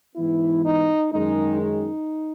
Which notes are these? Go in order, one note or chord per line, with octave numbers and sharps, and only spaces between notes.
G#2 E3 B3 E4
D#4
F#2 D#3 G#3 D#4
D#4